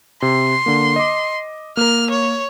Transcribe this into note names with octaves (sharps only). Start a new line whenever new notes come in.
C3 C6
D3 A#3
D#5 D6
A#3 A#4 F6
C#5